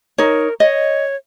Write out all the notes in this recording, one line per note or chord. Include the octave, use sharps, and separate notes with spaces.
D#4 A#4 C#5
C#5 D#5